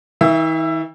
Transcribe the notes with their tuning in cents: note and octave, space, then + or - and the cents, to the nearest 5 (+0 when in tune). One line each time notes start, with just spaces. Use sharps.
E3 -45 E5 +15